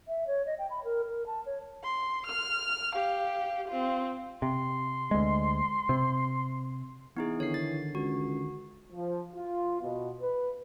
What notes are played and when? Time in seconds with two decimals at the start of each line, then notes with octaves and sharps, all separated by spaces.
0.08 E5
0.27 C#5
0.46 D#5
0.58 G5
0.70 B5
0.84 A#4
1.08 A#4
1.26 A5
1.46 C#5
1.83 C6
2.26 F6
2.95 G4 F5
3.68 C4 F4
4.42 C3 C6
5.11 D2 G#3
5.89 C3
7.17 E3 B3 D#4 G#4
7.40 D3 D#3 C#5 C7
7.54 A6
7.95 C#2 F#4
8.93 F3
9.34 F4
9.82 B2
10.21 B4